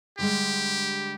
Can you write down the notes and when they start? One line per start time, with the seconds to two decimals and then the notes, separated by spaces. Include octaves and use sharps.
0.19 D3 G3 G#3 G4